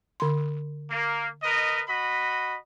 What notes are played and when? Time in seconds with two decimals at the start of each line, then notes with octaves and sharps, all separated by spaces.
0.20 D3 C6
0.91 A#3
1.43 A#4 B4 D#5
1.88 F#4 D#5 B5